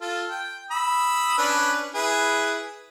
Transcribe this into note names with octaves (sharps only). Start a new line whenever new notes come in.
F4 A4
G5
B5 D#6 E6
C#4 D4 B4
E4 G#4 B4